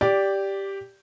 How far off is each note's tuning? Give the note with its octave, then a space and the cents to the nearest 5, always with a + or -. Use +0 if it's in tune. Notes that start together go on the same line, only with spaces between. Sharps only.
G4 +0 D5 -10